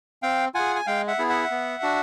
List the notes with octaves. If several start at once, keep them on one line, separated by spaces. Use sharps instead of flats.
C4 F5 G5
F4 G#4 F#5 G#5
G#5
G#3 F5 G5
E5 F#5
B3 E4 G#4
E5 F#5
B3
D4 F#4